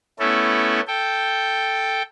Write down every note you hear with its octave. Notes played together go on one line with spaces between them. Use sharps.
A3 B3 C#4 E4 A4
A4 G5